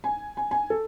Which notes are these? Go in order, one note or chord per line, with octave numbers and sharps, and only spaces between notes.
G#5
G#5
G#5
A4